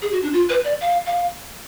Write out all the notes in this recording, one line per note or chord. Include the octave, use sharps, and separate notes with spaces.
G#4
F#4
D4
F4
B4
D5
F5
F5